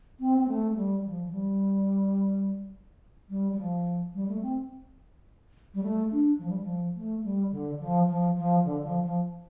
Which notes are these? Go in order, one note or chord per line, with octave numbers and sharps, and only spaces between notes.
C4
C4
A3
A3
G3
F3
F3
G3
G3
G3
F3
G3
A3
C4
G3
A3
D4
F3
G3
F3
A3
G3
D3
F3
F3
F3
D3
F3
F3